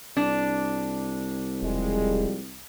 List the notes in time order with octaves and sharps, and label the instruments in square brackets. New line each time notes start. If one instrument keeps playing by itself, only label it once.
[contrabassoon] C2 [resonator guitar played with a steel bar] D4
[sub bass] E1 [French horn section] F3 G3 G#3